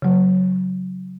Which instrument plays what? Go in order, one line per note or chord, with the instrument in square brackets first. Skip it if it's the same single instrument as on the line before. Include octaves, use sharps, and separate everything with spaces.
[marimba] C#3 F#3